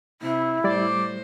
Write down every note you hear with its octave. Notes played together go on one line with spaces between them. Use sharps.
C3 E4
A2 G3 C5 D5